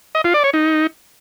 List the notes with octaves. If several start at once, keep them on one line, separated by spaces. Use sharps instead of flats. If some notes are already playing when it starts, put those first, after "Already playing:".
D#5
F4
D5
C#5
D#4